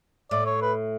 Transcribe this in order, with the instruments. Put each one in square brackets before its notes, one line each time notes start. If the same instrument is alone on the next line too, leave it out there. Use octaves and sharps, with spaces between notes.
[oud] A2 [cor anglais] D5
[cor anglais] C#5
B4